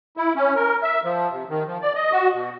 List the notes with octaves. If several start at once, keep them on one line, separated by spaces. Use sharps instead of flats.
E4
C#4
A#4
E5
F3
C3
D#3
F3
D5
D#5
F#4
B2